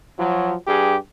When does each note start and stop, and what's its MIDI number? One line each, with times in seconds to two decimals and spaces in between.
0.18 0.54 53
0.18 0.54 54
0.67 0.97 43
0.67 0.97 67
0.67 0.97 68